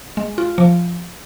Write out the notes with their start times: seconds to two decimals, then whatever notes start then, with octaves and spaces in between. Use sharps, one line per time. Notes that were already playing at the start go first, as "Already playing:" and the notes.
0.17 G#3
0.38 F4
0.58 F3